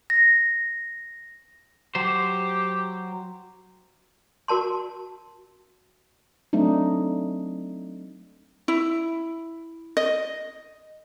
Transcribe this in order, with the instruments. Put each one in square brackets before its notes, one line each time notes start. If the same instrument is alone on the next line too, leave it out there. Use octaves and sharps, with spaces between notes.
[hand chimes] A#6
[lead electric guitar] F#3 C5 [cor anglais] G4
[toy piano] F#4 A#4 A5 C6
[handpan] F#3 A3 C4 D4 D#4
[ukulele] E4
D#5